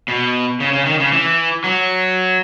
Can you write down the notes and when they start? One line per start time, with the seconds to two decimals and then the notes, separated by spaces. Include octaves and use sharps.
0.08 B2
0.60 C#3
0.73 C#3
0.86 D#3
1.00 C#3
1.12 E3
1.64 F#3